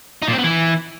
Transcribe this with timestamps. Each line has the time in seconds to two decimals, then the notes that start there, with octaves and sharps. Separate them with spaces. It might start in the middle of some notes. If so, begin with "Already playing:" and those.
0.22 D#4
0.28 A#2
0.33 C4
0.38 B3
0.44 E3